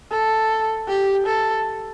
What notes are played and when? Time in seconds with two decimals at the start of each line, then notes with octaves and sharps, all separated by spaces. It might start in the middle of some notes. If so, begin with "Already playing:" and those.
0.11 A4
0.88 G4
1.26 A4